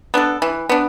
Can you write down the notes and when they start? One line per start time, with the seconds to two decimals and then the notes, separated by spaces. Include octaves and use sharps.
0.14 B3 D4 A4
0.42 E3
0.69 B3 D4